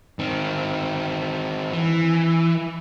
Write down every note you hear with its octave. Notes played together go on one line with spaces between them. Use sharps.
D#3 C4
E3